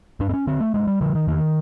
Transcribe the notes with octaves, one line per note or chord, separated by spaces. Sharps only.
G2 D4
C4
C#4
D3 C4
A3
G2 G#3
G3
D3 F3
D#3
E2 D#3